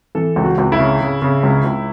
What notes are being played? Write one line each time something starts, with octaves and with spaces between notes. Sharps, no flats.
E3 A4
C#2
F#4
C#2
E4
C#3
C#3
C#3
C#2
C#2